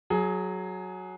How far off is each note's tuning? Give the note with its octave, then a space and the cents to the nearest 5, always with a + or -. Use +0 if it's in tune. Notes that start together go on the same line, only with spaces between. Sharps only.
F#3 +0 G#4 +20